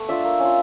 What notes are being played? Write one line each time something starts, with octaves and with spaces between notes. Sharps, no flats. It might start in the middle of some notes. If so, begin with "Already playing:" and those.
Already playing: A3 B3
D4 F4 E5
A#3
C#4 F4